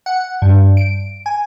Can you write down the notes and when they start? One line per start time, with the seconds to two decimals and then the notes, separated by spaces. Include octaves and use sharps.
0.06 F#5
0.42 G2
0.77 D7
1.26 G#5